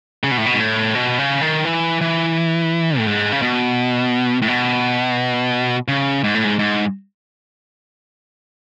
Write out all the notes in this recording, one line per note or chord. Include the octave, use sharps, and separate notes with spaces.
C#3
B2
A2
B2
G#2
A2
B2
C#3
D#3
E3
E3
A2
G#2
C#3
B2
A2
B2
C#3
G#2
A2
G#2
G#2